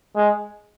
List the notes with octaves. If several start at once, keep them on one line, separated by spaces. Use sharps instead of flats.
G#3